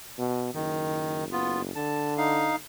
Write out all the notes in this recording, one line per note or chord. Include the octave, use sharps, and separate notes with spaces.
B2
F#1 D#3
B3 F4
D3 A5
D#4 F5